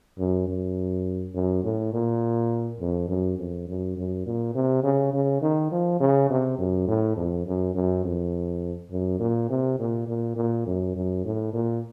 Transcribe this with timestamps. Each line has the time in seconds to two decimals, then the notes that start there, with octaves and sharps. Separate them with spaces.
0.18 F#2
0.47 F#2
1.35 F#2
1.64 A2
1.93 A#2
2.80 F2
3.09 F#2
3.38 F2
3.68 F#2
3.97 F#2
4.26 A#2
4.55 C3
4.84 C#3
5.14 C#3
5.42 D#3
5.72 F3
6.00 C#3
6.30 C3
6.59 F#2
6.88 A2
7.16 F2
7.46 F#2
7.75 F#2
8.04 F2
8.91 F#2
9.20 A#2
9.50 C3
9.79 A#2
10.08 A#2
10.36 A#2
10.66 F#2
10.95 F#2
11.25 A2
11.53 A#2